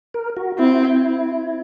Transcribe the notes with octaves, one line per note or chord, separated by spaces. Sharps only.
A#4
F#4
C4 E4